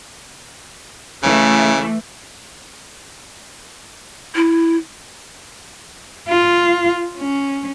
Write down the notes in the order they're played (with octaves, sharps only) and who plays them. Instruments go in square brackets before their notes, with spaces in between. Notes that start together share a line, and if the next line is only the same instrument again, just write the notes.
[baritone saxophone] C#3 [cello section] E3 A3
[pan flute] E4
[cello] F4
C#4